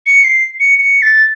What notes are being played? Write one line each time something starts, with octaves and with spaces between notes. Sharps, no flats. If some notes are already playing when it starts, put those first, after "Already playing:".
C#7
C7
C#7
C#7
A6